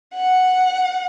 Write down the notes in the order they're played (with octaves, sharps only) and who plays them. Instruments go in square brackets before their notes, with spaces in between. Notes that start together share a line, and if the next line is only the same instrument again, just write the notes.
[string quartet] F#5